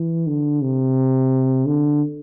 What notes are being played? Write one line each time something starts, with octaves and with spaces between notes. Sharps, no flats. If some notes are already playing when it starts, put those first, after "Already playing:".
Already playing: E3
D3
C3
D3